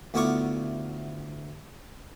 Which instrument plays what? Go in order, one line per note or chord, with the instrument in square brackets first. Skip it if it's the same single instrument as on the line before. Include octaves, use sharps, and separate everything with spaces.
[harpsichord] D2 B3 E4 F4 C#6 D6